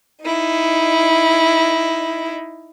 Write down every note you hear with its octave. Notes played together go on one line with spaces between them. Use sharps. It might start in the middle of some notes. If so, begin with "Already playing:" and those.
D#4 E4